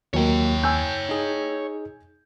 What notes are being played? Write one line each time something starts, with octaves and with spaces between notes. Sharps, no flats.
D#2 F#3 A#3 C#5 G5
G#5 E6 G6
D#4 G#4